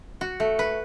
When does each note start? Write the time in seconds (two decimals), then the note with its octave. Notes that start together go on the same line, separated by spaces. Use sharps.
0.21 F#4
0.40 A3
0.59 B4